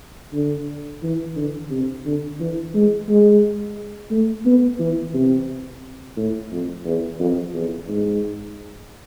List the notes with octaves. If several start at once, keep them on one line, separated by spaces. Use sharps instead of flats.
D3
E3
D3
C3
D3
E3
G#3
G#3
A3
B3
E3
C3
A2
F2
E2
F2
E2
G#2